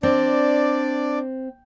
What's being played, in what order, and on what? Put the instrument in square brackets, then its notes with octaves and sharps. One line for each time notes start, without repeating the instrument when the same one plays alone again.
[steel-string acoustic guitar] C4 [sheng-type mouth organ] D4 D5